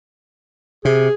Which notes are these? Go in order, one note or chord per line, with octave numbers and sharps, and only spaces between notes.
C3 G#4